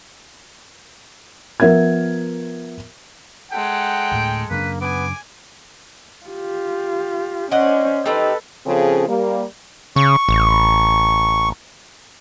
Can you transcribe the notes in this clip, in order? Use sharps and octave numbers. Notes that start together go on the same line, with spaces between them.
F3 B3 A#4 E5 G#6
G#3 A4 F#5 G5
D2 A2
F#2 C#3 A#3 D4 B4
B3 G#5 D6
F4 G4
C#4 C5 D5 D#5 F#5
C4 D#4 G4 A4 B4
C#3 F3 C4 C#4 G#4 A4
G3 A#3
C#3 C#6
A1